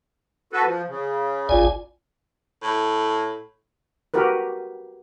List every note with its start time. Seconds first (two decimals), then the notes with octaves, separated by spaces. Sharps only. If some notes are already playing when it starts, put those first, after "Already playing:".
0.53 F#4 A4 B4
0.65 F3
0.89 C#3
1.49 G#1 F4 D5 G#5
2.63 A2
4.14 F#4 G4 A#4 B4